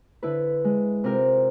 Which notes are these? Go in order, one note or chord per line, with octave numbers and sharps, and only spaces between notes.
D3 E4 B4
G#3
C3 C4 F4 A#4